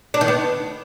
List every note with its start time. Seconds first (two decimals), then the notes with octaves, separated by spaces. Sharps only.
0.14 D4
0.21 D#3
0.28 B3